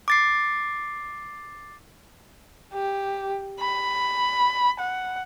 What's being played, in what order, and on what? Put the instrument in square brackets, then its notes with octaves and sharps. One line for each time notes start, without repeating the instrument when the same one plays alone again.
[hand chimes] D6 A6 C7
[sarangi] G4
B5
F#5